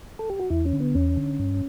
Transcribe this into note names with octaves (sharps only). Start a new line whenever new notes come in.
A4
G4
F#4
E2 E4
C#4
D3
B3
E2 C#4
D3
G2